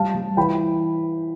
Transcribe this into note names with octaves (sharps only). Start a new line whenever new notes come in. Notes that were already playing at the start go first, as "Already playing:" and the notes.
Already playing: G3 F5 A5
G3
E3 G5 B5